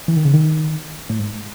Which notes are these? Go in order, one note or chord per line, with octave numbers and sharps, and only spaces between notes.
E3
D#3
C#3
D#3
A2
G#2